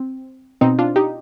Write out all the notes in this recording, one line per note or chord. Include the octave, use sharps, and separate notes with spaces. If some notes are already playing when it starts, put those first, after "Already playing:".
Already playing: C4
B2 C4 D#4
D4 F4
D#4 G4